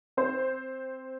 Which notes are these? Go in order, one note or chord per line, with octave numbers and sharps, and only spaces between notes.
C4 C5